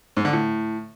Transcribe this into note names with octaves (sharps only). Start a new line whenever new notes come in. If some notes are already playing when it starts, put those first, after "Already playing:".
G#2
D3
A2